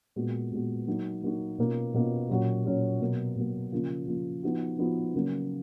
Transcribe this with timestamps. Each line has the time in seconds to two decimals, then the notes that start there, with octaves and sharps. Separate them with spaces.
0.16 A#2 G#3 B3 F#4
0.52 A#2 G#3 B3 F#4
0.87 F#3 A#3 D#4 F#4
1.23 F#3 A#3 D#4 F#4
1.58 B2 A#3 C#4 F4
1.94 B2 A#3 C#4 F4
2.30 A#2 F#3 C#4 F#4
2.65 A#2 F#3 C#4 F#4
3.01 B2 F#3 A#3
3.36 B2 F#3 A#3
3.72 C#3 F3 A#3 F4
4.08 C#3 F3 A#3 F4
4.43 F3 B3 D#4 F#4
4.79 F3 B3 D#4 F#4
5.14 C#3 F#3 A#3